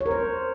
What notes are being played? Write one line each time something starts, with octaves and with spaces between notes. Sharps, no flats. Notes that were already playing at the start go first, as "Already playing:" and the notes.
C#5
A#4
C5